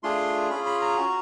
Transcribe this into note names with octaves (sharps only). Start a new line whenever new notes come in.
A3 D4 F4 G#4 C6
C#4 F4 G#4 B5
B5
A#5
C#4 F#4